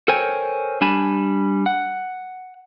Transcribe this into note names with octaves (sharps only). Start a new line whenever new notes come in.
A4 A#4 C5 C#5 G5 G#5
G3 D4 G#5 A5 B5
F#5